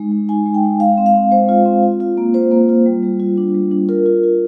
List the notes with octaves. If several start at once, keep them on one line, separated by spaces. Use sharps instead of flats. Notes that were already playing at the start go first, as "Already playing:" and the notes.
Already playing: G#3 D#4
G#3
D#4 G#5
G#3
G5
D#4
G#3 F5
C4
F5
C4
G#3 C5
F4
C4
F4
F4
A#3
F4 C5
A#3
F4
G3
G3
F4
D4
G3
D4
F4 A#4
F4
F4